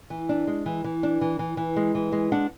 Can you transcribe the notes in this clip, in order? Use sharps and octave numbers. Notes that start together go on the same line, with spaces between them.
E3
D4
G#3
E3
E3
D4
E3
E3
E3
G#3
E3
G#3
D4 F#5